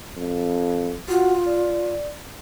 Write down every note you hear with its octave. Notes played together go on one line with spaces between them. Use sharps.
F2
F4 F#4
D5